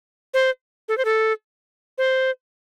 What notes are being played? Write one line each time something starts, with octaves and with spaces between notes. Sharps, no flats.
C5
A4
C5
A4
C5